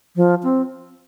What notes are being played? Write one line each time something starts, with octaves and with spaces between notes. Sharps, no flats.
F3
C4